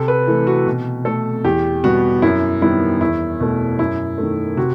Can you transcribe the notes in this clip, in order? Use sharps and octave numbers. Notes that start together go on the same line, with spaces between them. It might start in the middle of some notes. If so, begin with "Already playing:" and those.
Already playing: C3 A4
B4
E3 A3
F#4
B2
A3 A4
E2 G4
B2 G3 B3 F#4
F#2 E4
D#3 G3 B3 E4
E2 E4
B2 A3
F#2 E4
D#3 A3
C3 F#4